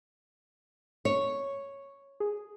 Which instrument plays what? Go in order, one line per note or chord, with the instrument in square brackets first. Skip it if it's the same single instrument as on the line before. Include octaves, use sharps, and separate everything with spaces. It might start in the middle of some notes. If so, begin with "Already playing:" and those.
[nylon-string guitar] C#5
[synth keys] G#4